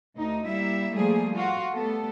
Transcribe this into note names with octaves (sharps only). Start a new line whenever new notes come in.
D2 D#4
G3 A#3 E4 E5
F3 G3 A3 A#3 G#4
F4 F#4
G3 A3 B3 A4